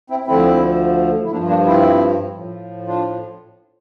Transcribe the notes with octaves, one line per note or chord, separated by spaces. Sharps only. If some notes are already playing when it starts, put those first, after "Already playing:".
C4 E4
D2 D3 F3 C4 E4
E4
G2 F3 A#3 D4
A#3 D4
C4 E4
A2 F3
D4 F4